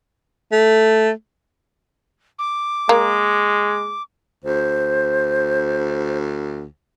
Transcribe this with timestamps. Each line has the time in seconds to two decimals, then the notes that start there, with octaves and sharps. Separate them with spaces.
0.52 A3
2.39 D6
2.89 G#3 A#3
4.45 D2 C5